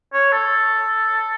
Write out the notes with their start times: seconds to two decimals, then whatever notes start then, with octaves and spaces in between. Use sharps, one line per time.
0.13 C#5
0.32 A4